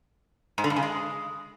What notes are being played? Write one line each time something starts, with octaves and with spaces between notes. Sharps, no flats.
G#2
D3
G2
C#3
G#3